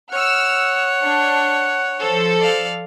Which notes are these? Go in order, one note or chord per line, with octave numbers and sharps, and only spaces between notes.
C#5 F#5 E6 F6
D4
F3 A4 C5
D5 F5